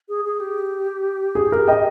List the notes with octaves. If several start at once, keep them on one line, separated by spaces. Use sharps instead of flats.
G#4
G#4
G4
G#4
A#4
D#5 G5